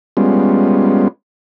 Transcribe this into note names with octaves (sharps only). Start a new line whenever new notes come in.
G3 G#3 B3 C#4 F4